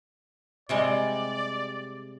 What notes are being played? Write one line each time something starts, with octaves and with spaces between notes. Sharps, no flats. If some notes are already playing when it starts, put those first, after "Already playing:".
C3 G3 G#3 D5